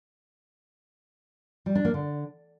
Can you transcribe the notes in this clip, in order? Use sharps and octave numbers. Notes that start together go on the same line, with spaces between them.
G3
D4
A#3
D3